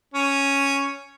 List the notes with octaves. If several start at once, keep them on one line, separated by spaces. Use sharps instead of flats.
C#4